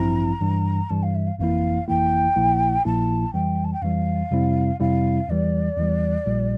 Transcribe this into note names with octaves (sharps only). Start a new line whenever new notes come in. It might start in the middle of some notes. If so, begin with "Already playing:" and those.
Already playing: A1 G2 F3 C4 E4 A#5
G2 E3 G3
G2 E3 G3 A5
F5
E5
F5
G1 F2 E3 A#3 E4 F5
G1 F2 E3 A#3 E4 G5
A#1 A#2 F3 A#3 E4
A#1 A#2 F3 A#3 E4 A5
F2 E3 G3 G5
A5
G5
F2 E3 G3 F5
F2 C3 G3 C4 E4
F2 C3 G3 C4 E4 F5
E2 E3 G3 D5
E2 E3 G3
A#1 A#2 G3